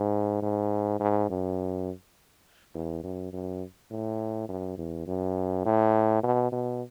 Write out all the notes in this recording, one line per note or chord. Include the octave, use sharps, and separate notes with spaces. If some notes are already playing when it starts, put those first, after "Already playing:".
Already playing: G#2
G#2
G#2
F#2
E2
F#2
F#2
A2
F#2
E2
F#2
A2
B2
B2